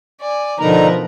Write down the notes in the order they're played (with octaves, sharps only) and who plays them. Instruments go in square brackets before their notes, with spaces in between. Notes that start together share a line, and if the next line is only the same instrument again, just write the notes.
[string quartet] D5 G#5
[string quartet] B2 A#4 B4 [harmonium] D3 D#4 A#5 [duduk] F3